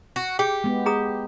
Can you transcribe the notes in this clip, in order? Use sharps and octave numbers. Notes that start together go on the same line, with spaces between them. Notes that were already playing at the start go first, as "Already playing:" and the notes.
F#4
G4 G#4 G5
G#3 B3
G#4 A#5 D#6